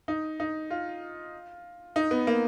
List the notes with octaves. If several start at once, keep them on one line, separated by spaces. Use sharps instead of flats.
D#4
D#4
F4
D#4
B3
A#3